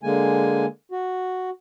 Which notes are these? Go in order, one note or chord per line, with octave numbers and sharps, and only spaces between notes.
D3 G#3 A#3 G#5
F#4